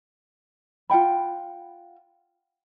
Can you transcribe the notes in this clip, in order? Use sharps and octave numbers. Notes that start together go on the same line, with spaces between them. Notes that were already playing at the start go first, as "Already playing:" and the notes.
F4 F#5 G5 B5